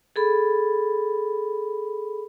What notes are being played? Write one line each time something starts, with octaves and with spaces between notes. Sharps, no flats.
G#4 A4 B5